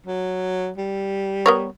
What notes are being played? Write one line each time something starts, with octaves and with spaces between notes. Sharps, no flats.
F#3
G3
B3 A#4 C#5